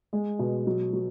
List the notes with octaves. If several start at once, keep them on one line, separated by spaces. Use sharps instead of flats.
G#3
B2
F#3
F#3